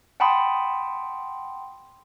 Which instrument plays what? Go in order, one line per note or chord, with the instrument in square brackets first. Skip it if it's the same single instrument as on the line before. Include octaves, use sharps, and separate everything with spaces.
[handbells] F#5 G5 A5 B5 C6 D#6